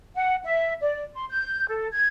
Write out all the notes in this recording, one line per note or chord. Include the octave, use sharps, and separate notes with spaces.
F#5
E5
D5
C6
G6
A4
G#6